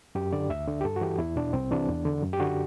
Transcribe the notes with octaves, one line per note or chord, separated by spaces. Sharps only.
F#2 G4
D3 D5
D2 E5
D3
G4
G2 A4
F#4
E3 G4
E2 E4
B2 D4
C2 C4
C3 E3 D4
E2
D3
F#2
G4
D3 F#4